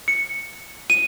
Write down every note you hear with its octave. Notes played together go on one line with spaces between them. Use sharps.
C#7
D#7